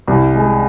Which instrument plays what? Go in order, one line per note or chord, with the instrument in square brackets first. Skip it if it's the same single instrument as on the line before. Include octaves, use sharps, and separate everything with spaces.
[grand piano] C2
G#3